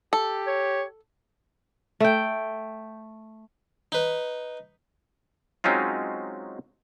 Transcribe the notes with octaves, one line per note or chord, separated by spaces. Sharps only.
G4 A4
C#5
A3 G5
D#4 B4
F#3 G#3 C4 C#4 D#4 F4